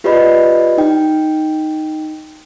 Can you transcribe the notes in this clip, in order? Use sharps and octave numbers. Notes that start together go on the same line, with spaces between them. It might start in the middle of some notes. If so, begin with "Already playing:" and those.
F4 G4 B4 D5 D#5 B5
D#4 G5